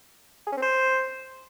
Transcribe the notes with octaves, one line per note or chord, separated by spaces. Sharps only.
G#4
C#4
C4
C5